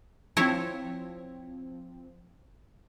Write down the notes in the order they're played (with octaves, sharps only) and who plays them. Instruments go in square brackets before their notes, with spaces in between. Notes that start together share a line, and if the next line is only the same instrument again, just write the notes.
[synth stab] F3 C4 [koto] E4 C#5